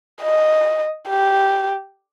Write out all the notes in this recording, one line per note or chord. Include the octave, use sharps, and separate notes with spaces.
D#5
G4